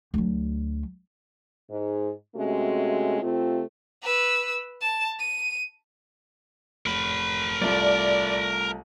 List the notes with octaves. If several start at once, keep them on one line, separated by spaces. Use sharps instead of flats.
D2 F#3
G#2
C3 G#3 A3 C#4 F#4
C3 A3 C4 F4
B4 E6
A5
D#7
F1 A#4 B5
C2 A3 F4 D5